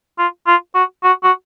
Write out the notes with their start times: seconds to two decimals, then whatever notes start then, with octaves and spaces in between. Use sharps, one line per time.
0.18 F4
0.47 F4
0.75 F#4
1.03 F#4
1.24 F#4